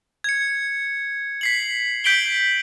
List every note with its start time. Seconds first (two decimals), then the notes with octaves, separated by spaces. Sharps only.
0.24 G#6 C#7
1.41 B6 C7 F#7
2.04 G6 B6 D7 F#7 G7